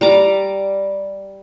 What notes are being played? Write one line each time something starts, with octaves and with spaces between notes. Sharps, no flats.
G3 A#5 D6